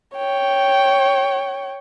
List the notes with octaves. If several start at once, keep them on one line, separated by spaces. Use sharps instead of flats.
C#5 G5